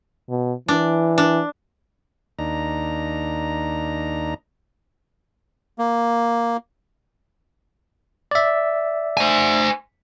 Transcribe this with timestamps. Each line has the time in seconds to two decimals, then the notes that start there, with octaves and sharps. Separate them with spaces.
0.29 B2
0.68 E3 D4
1.18 D4
2.39 D#2 D4 D#4 A#5
5.78 A#3
8.31 D5 E5
9.17 C5 G#5